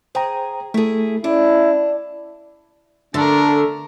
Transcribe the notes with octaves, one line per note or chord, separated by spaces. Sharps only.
G#4 C5 G5 A#5
A3 E4 G#4 A4
C#4 D4 E4
D3 A3 D4 A4 A#4